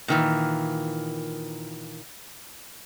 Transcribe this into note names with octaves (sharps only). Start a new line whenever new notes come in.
A#2 D#3 E3